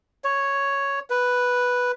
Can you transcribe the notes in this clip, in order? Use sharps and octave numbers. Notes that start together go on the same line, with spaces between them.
C#5
B4